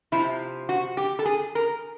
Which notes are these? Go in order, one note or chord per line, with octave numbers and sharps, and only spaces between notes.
C3 F3 E4
F#4
G4
A4
G#4
A#4